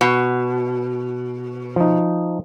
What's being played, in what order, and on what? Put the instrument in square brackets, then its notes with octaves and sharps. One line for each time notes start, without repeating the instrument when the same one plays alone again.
[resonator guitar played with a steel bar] B2
[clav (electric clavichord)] F3 D#4